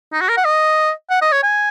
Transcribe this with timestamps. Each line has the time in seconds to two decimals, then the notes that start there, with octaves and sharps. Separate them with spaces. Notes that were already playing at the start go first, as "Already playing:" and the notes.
0.13 D#4
0.21 F#4
0.29 A#4
0.37 F#5
0.45 D#5
1.10 F#5
1.22 D#5
1.32 C#5
1.43 G#5